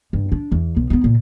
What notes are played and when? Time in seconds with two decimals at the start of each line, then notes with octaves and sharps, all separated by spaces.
0.13 G2
0.32 D4
0.52 E2
0.76 B1
0.90 B3 D#4
1.04 A#2